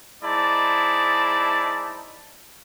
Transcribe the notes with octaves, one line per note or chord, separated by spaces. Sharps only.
G#3 D#4 E4 C5 D5 A5